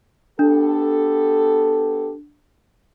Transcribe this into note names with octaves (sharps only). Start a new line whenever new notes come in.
B3 D4 G4 A4